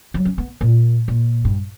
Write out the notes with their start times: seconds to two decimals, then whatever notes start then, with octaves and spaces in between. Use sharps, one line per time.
0.14 F#3
0.25 C#4
0.38 B3
0.61 A#2
1.08 A#2
1.45 G2